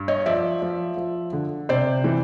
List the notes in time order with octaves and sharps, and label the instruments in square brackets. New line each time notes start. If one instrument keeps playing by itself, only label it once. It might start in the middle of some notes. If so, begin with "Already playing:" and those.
Already playing: [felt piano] G2
C#5 D#5
F3 D5 E5
F3
F3
D3
C3 C5 D5
E3